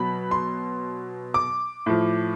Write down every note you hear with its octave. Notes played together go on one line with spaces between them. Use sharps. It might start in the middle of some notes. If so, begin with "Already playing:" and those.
Already playing: B2 F#3 B5
C6
D6
A2 F3